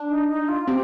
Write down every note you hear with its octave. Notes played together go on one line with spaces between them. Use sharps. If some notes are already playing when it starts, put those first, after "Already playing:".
Already playing: D4
D#4
D#4
F4
C4 G4